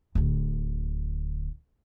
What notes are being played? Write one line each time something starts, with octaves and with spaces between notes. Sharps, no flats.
D1 D2